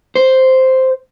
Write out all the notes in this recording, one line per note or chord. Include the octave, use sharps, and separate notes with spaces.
C5